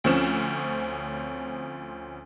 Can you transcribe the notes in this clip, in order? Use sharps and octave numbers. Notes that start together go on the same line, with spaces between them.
D2 F3 C4 C#4 F6 E7